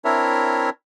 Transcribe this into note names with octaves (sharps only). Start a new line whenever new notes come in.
C4 D4 E4 A#4 C#5 E5